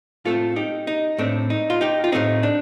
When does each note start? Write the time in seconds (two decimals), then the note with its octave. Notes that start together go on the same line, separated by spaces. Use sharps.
0.25 A2 A3 C4 F4 A4
0.56 D#4 G4
0.87 D#4
1.18 A2 A3 C4 D4
1.50 D#4
1.70 F4
1.81 D#4 G4
2.04 F4
2.12 A2 A3 C4 D#4
2.43 D4